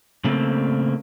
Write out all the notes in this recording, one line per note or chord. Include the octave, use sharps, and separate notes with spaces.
C#3 A3 A#3 C4